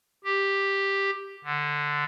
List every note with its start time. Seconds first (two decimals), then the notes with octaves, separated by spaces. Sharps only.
0.24 G4
1.44 D3